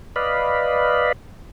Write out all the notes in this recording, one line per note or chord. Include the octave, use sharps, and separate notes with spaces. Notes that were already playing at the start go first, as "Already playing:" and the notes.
B4 D5 D#5 F5 B5